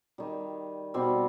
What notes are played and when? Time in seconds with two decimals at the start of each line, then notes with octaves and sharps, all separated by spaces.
0.18 D#3 G3
0.94 B2 G3 C4